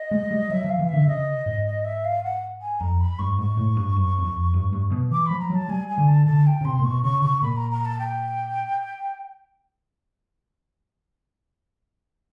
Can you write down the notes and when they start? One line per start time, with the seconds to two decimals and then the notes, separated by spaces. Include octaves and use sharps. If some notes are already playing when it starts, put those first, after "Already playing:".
Already playing: D#5
0.11 G#3
0.31 G3
0.50 F#3 E5
0.64 F3 F5
0.79 E3
0.89 D3 E5
1.08 C#3 D#5
1.46 G#2
1.66 D#5
1.85 E5
2.04 F5
2.23 F#5
2.61 G#5
2.80 F2 A#5
3.00 B5
3.19 G2 C#6
3.38 G#2 C#6
3.57 A2
3.77 G2
3.96 F#2
4.19 E2
4.25 F2
4.54 G2
4.73 G2
4.92 B2
5.11 E3 D6
5.26 F3 B5
5.40 A#5
5.50 F#3 A5
5.69 G3 G#5
5.88 G#5
5.98 D3
6.08 A5
6.26 D3 A5
6.46 G5
6.61 C#3
6.65 C3 C6
6.79 A#2
6.84 B2 C#6
7.03 C#3 C#6
7.22 C#3 C#6
7.42 A#2 B5
7.56 A#5
7.71 A#5
7.85 A5
7.99 G5